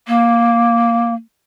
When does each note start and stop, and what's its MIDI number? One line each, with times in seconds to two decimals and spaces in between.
0.08 1.14 58